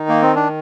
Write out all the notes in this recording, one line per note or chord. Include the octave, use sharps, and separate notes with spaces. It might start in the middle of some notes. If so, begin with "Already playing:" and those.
Already playing: D#3 D#4
A#3
C4
D4